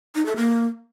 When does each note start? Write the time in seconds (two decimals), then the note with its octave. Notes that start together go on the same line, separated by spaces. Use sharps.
0.15 D#4
0.26 A4
0.36 A#3